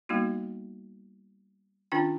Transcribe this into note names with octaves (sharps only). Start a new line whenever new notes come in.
G3 A#3 B3 D#4 F#4
D#3 C#4 D4 F4 G5